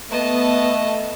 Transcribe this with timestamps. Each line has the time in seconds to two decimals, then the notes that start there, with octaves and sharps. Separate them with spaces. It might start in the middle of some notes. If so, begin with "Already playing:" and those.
0.11 A3 B3 D#5 A5